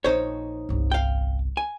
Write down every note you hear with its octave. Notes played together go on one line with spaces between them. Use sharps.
A#1 D#4 C5 C#5
G1 C2
F5 G5
G#5